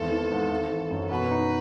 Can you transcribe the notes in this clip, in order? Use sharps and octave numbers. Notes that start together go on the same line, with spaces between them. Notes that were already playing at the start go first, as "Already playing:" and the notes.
Already playing: G#1 E2 A4
E3
G#2
G#1
E3
F#2
B2 B4
D#4